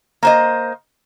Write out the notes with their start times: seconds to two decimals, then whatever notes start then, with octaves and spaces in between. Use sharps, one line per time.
0.23 A#3 C5 D#5